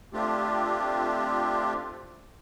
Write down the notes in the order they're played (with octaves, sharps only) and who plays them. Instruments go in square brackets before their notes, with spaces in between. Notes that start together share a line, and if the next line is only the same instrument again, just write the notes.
[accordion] A3 C4 D4 F4 G4